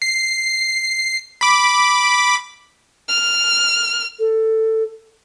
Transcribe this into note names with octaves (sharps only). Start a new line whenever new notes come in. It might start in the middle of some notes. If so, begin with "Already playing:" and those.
C7
B5 D6
F6
A4